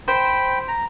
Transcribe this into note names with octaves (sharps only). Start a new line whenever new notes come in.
C5 G5 B5
A#5